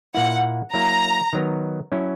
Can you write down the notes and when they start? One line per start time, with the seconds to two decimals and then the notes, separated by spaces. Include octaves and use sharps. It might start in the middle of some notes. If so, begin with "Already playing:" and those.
0.15 A#2 A#3 E4 F#5
0.74 F#3 A#3 E4 A#5
1.33 D#3 F#3 B3
1.92 F#3 C#4 E4